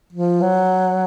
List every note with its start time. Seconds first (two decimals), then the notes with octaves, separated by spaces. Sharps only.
0.13 F3
0.41 F#3